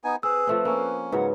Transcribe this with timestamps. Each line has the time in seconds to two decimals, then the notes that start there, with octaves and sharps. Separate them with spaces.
0.04 B3 D#4 G#5
0.23 C4 G#4 B4 E6
0.47 F3 A3 C4
0.65 A#3 C4 C#4
1.12 G#2 C#3 F#3 B4 F#5